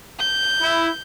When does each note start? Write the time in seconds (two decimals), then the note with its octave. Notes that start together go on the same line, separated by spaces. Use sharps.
0.19 G6
0.60 E4